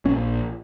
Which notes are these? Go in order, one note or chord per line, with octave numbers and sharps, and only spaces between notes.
A#1 A#2 C#4